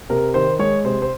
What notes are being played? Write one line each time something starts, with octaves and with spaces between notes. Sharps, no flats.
C3 A#4
D#3 C5
G#3 C#5
C3 C5
C5